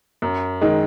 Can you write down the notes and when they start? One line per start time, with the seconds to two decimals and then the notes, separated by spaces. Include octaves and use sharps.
0.22 F#2
0.61 D#3 G#3